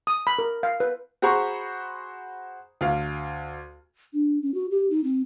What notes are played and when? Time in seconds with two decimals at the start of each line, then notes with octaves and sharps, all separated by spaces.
0.07 D#6
0.27 B5
0.39 A#4
0.63 F5
0.80 B4
1.22 F#4 G#4 C5 A#5 B5 C#6
2.81 D2 F5
4.13 D4
4.42 C#4
4.54 F#4
4.71 G4
4.90 D#4
5.04 C4